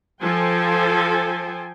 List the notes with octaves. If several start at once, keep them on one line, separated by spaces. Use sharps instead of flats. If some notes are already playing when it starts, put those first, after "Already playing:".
F3 A4 C5 G5 G#5